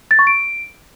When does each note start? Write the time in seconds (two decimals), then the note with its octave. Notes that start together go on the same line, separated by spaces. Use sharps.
0.11 A6
0.19 C#6
0.27 D7